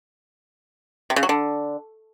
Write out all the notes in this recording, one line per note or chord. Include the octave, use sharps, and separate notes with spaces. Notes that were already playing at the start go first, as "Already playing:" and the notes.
C3
C#3
F#3
D3